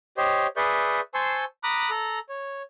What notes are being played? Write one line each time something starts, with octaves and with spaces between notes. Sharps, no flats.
G4 C5 C#5 D#5
G#4 B4 D5 E5 C#6 G6
C5 G#5 A5 C6 C#6 E6
A#5 B5 D6 D#6 F#6
A4 A#5
C#5